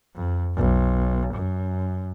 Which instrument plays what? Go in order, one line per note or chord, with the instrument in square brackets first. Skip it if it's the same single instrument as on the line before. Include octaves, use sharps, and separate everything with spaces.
[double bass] F2
B1
F#2